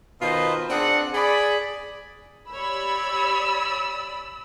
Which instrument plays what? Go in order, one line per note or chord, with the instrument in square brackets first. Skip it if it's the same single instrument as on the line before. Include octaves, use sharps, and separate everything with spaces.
[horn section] B2 D#3 F4 B4 C5 D#5
C4 D4 G#4 F#5
G#4 D5 B5
[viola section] G4 C#5 [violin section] D5 B5 [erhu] E6